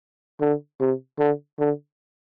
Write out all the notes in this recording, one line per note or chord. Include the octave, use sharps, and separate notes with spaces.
D3
C3
D3
D3